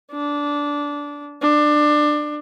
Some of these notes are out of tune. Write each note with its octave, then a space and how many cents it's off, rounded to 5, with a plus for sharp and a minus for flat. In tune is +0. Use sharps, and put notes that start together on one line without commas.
D4 -15
D4 +20